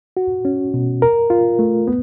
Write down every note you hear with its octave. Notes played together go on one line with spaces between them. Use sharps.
F#4
C#4
B2
A#4
F4
A3
B3